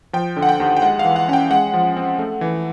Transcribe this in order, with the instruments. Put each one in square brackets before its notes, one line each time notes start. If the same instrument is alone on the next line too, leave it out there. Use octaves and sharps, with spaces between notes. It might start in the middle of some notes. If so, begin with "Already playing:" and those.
[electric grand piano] F3 G5
D3
F#5
G5
D#2
G5
G#3 F#5
F5
E3
F#5
C#4 F#5
G5
G#3 F#5
F3
C4
A3
E3